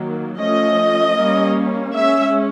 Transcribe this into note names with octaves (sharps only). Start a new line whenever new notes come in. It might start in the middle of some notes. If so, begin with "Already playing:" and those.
Already playing: D#3 F#3 A#3
F3 A3 C#4 D#5
G3 A#3 C#4
G#3 C#4 E5